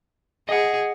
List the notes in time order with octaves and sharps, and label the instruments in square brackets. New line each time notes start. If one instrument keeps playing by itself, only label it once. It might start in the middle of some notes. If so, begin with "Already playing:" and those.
[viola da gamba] G#4 [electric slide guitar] D#5 F#5